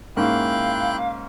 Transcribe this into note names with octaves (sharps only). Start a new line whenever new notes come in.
G#2 A#3 C#4 E4 F5 G5 F#6